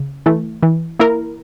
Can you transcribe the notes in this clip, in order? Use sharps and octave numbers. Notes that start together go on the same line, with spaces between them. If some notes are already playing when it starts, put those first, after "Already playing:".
Already playing: C#3
E3 A3
E3
A#3 E4 A#4